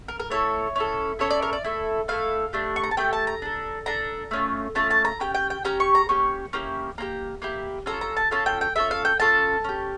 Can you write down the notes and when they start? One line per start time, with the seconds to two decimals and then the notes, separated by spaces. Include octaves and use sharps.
0.08 A#4
0.20 A#4
0.30 A3 E4 A4 C#5
0.76 C#4 E4 A4
1.19 C#4 E4 A4 C#5
1.30 D5
1.42 A#4
1.53 D5
1.64 A3 E4 A4
2.08 A3 E4 A4 F5
2.53 A3 D4 G4
2.76 C#6
2.84 A#5
2.91 A5
2.97 A3 D4 G4 G5
3.13 A5
3.27 A#5
3.42 D4 A4
3.86 D4 A4 A#5
4.31 A3 C#4 F4
4.75 A3 C#4 F4 A5
4.91 A5
5.05 A#5
5.20 C#4 G4 G5
5.34 G5
5.50 G5
5.65 C#4 G4 A#5
5.80 C#6
5.95 A#5
6.09 A#3 C#4 G4 C#6
6.53 A#3 C#4 E4 G4
6.98 A#3 E4 G4 A#5
7.42 A#3 E4 G4
7.86 C#4 F4 A4 A#5
8.01 A#5
8.17 A5
8.31 C#4 F4 A4 A5
8.46 G5
8.61 G5
8.76 C#4 F4 A4 E5
8.91 F5
9.05 G5
9.20 C#4 F4 A4 A5
9.64 C#4 G4